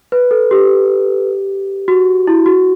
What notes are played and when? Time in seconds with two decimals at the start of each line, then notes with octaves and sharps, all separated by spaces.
0.12 B4
0.31 A4
0.51 G4
1.88 F#4
2.27 E4
2.46 F#4